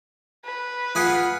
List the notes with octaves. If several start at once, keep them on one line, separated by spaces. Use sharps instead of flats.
B4
F4 G#4 F#5